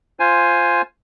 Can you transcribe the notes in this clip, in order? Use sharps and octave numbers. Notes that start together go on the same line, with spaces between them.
F4 C5 G#5